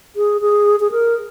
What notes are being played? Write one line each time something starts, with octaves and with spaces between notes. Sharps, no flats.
G#4
G#4
G#4
A#4